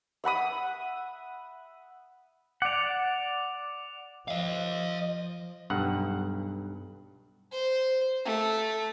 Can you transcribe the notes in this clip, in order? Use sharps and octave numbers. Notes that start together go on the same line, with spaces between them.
E5 F#5 B5 D#6
D5 F#5 D6 F7
F3 D#5 F5
B1 G2 F#5
C5
A3